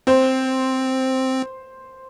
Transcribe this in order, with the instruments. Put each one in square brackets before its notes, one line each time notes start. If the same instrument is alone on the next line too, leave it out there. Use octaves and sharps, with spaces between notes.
[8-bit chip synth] C4 [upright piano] C5